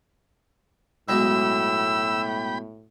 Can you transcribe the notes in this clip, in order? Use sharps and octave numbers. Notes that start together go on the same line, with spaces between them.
B1 A2 G#3 G5 B5 E6